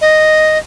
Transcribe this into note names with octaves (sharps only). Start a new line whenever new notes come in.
D#5